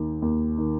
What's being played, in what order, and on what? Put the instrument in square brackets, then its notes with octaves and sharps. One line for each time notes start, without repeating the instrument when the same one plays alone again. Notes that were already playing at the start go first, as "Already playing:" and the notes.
Already playing: [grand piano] D#2 D#3
D#2
D#3